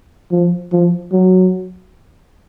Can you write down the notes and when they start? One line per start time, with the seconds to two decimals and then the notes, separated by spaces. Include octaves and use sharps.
0.31 F3
0.72 F3
1.13 F#3